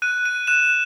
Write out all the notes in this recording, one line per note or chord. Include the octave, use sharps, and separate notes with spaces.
F#6 D#7
D#7
F#6 E7